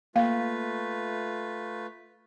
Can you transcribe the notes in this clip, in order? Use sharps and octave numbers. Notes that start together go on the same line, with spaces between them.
A3 A#3 F4 B4 F5